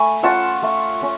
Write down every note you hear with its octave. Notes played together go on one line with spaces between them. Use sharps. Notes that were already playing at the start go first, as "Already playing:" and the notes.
Already playing: A3 G#5 B5
C#4 F4 F#5 A5
A3
C#4